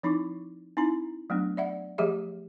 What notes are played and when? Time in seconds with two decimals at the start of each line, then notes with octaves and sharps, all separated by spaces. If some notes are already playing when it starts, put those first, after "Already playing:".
0.03 F3 C4 D#4 E4 C#6 D6
0.77 C4 D#4 E4 A#5
1.30 F#3 A3 B3 D4
1.57 D5 E5 F#5
1.98 F3 A3 G4 G#4 D#5 E5